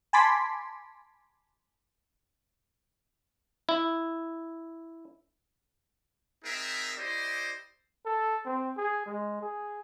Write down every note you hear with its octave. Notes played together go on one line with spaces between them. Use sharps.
G#5 A5 B5 C6 D6 B6
E4
C4 D#4 G#4 A#4 E5
E4 G4 C5 D5 D#5
A4
C4
G#4
G#3
G#4